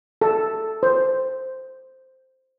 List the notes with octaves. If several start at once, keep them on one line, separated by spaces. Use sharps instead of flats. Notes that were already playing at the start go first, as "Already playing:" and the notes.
A4
C5